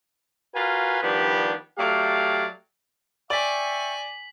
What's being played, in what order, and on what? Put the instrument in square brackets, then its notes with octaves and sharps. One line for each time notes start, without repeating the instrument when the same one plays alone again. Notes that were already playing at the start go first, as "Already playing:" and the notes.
[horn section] F4 F#4 A#4 B4 F5 G#5
D#3 F3 G3 B3 D4 G4
F#3 A3 G4 D5 F5
[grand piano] D5 [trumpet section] E5 G5 C#6 [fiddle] G#5 [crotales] B6 F#7